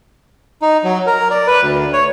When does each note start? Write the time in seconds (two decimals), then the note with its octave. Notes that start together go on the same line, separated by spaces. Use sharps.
0.62 D#4
0.84 F#3
1.07 A#4
1.31 D5
1.47 B4
1.62 D2
1.93 C#5